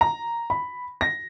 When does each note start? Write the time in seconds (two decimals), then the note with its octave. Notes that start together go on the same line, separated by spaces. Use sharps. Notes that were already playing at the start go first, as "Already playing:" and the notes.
0.01 A#5
0.50 B5
1.01 A#6